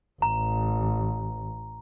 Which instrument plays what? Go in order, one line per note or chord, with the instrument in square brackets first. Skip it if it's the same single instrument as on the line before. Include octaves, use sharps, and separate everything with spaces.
[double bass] A1 [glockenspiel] A#5